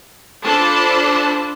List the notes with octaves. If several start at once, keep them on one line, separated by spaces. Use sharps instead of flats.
D4 F4 A4 C5 A5 B5